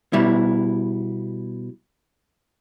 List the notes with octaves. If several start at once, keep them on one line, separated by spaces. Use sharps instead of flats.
B2 G3 E4